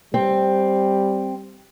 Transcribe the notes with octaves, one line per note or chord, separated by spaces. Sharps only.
G3 C4